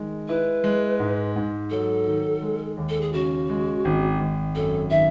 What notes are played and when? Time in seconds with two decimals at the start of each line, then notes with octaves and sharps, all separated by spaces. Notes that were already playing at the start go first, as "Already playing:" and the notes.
Already playing: D#3 G#3
0.28 E4 B4
0.64 G#3
1.00 G#2
1.36 G#2
1.70 F#3 A4
2.07 D#3
2.42 G#3
2.77 D#2
2.89 A4
3.01 G#4
3.13 C#3 F#4
3.49 G#3
3.85 G#1
4.20 G#1
4.55 F#2 A4
4.91 D#3 E5